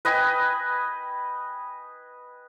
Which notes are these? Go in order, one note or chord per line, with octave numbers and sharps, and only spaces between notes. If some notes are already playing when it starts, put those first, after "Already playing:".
B4 D#5 G5 G#5